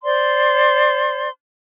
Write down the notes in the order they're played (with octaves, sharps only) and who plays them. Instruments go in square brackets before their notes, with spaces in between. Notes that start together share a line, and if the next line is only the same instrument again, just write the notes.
[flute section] C5 D5 C6